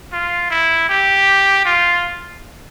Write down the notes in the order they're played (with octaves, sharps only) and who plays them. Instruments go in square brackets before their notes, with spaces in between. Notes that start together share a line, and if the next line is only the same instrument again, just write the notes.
[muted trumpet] F4
E4
G4
F4